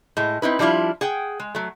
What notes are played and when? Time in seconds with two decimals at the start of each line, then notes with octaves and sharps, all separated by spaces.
0.17 A2 G#3
0.42 C4 D#4 E4 B4
0.59 F3 G3 D4 E4 F4
1.01 G#4 F#5 G5
1.40 G#3
1.55 F#3 A3